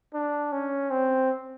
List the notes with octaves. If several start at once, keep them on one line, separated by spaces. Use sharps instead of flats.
D4
C#4
C4